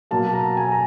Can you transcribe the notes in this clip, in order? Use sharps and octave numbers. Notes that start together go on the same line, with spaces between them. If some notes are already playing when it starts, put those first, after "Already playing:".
B2 F#3 A#3 A5
A#5
G#5
A#5